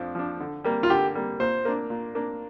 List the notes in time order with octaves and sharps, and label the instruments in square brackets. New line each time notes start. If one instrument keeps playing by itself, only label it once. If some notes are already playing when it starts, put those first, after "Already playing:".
Already playing: [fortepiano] F2 F3 D4
F3 D4
D3
G3 A#3
[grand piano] F4
[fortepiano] D3 [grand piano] G4
[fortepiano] G3 A#3
[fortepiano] A#2 [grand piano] C5
[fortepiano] A#3 D4
A#2
A#3 D4